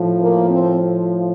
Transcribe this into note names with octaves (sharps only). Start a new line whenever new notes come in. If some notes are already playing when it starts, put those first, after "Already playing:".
Already playing: A2 F3
A#3
C4